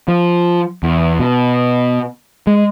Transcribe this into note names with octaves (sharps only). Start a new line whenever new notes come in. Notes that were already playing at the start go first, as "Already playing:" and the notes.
F3
E2
B2
G#3